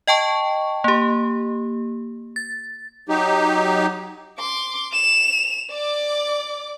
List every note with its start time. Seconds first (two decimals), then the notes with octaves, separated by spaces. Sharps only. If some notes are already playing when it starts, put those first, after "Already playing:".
0.07 D#5 G5 A5 C#6
0.84 A#3 G4
2.36 A6
3.09 F#3 D#4 G4
4.39 C6 D6
4.93 E7 F7
5.71 D5 D6